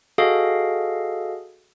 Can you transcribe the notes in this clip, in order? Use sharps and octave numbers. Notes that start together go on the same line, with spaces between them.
F#4 G#4 A4 D#5 F5